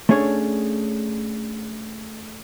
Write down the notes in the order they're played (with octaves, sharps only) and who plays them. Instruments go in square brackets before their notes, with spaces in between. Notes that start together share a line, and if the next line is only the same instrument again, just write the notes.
[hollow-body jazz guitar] A3 C#4 D4 G#4 C#5